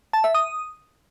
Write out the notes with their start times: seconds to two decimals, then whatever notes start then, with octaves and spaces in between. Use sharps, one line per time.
0.13 A5
0.24 E5
0.35 D#6